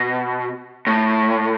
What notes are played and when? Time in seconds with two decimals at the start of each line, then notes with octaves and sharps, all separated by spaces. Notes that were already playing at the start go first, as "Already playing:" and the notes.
Already playing: B2
0.87 A2